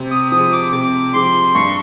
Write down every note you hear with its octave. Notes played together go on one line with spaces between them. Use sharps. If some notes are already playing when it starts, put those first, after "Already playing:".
Already playing: C3
D#6
F3 D#6
G#3
D6
C3 D6
F3 G#3 C6
G2 C#6